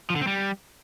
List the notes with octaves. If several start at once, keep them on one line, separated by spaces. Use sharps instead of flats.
F3
D3
C4
G3